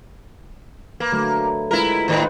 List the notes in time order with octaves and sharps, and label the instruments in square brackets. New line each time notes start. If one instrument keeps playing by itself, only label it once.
[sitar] A#3 [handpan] B4
[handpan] D3 F#3 A3
[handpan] G#3 F4 B4 [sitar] E4 A#4
[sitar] A2 D#3 [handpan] B4 C5